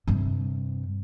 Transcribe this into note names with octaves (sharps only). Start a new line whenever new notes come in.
G2 C3